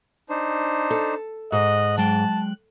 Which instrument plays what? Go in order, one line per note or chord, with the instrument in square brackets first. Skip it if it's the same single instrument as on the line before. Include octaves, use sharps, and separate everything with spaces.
[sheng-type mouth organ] D4 D#4 C5
[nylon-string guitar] A4
[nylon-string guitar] G#2 [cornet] D#5 [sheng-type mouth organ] F#6
[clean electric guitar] F#3 G#3 G5 [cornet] A5